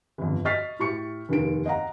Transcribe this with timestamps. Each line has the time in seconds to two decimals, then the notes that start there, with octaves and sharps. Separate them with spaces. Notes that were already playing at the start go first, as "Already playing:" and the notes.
0.18 G1 F2
0.45 D#5 C#6 F6 A6 B6 C7
0.79 A2 G4 C#6 C#7
1.29 F1 D#2 D#3 D7
1.66 D#5 F5 F#5 A#5